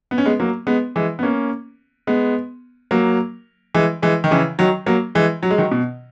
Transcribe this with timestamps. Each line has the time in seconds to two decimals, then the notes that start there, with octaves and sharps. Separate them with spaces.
0.11 B3
0.18 C#4
0.26 G#3 B3
0.40 F#3 A#3
0.67 G#3 B3
0.96 E3 G#3
1.19 B3
1.23 A#3 C#4
2.07 G#3 B3
2.91 F#3 A#3
3.74 E3 G#3
4.02 E3 G#3
4.24 D#3
4.31 C#3 E3
4.59 D#3 F#3
4.86 F#3 A#3
5.15 E3 G#3
5.43 F#3
5.51 G#3
5.58 D#3 F#3
5.71 B2